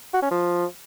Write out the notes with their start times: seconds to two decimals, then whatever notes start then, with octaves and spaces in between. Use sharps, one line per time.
0.14 F#4
0.22 C#4
0.31 F3